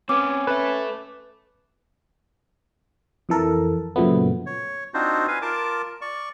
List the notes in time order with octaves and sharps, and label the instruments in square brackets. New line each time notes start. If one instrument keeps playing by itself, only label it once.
[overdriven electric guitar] C4 B4 [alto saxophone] C#4 [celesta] D6
[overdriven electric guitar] A4 E5 [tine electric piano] B4
[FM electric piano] F2 E3 A4 A#4
F#2 A#2 C#3 F3 A3 B3
[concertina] C#5
C4 D4 D#4 F4 F#4 C5
B4 F5 G#5
F4 A#4 A5 D6
D5 C#6